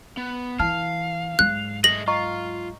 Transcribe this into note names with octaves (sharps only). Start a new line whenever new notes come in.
B3
E3 F5 A5 F6
G#2 F#3 F#6
A3 G#4 D#5 A#6 F#7
F4 D#5 A#5 C#6